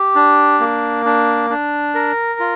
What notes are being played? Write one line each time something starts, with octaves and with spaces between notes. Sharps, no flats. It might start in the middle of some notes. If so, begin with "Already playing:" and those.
Already playing: G4
D4
A#3
D4
D4
A#4
F4